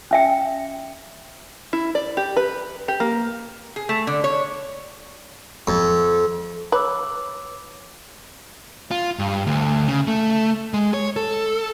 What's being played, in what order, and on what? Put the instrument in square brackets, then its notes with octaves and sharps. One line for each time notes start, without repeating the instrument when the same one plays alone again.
[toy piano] C#4 E5 G5
[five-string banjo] E4
D5
G4
B4
G4
A#3
[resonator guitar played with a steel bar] G#4
A3
D3
C#5
[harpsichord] F2
[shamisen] B4 [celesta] C#5 D6 E6
[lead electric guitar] F4
G2
D2
C#3
A3
G#3
C#5
A4